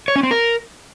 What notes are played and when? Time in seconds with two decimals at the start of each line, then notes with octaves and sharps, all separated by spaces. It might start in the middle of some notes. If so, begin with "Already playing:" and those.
0.08 C#5
0.16 C#4
0.23 C4
0.31 A#4